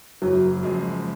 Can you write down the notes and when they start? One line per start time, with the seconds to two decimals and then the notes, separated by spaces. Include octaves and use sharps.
0.22 F#1 F#3
0.63 F#2 F3 G#3